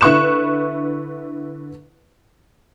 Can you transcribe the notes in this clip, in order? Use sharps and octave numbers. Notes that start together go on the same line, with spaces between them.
D3 E4 B4 C#6 F#6 E7